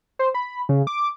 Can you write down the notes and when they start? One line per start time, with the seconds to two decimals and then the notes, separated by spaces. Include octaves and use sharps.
0.19 C5
0.34 B5
0.69 C#3
0.87 D6